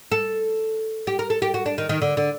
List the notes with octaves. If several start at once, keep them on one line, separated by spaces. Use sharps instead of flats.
A4
G4
A#4
A4
G4
F#4
D4
D#3
D#3
D3
D3